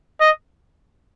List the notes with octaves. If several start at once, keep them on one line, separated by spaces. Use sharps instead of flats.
D#5